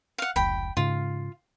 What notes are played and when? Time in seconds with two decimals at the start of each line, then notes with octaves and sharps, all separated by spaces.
0.18 F5 F#5
0.36 F1 C#2 G5 B5
0.77 G#2 C#3 F4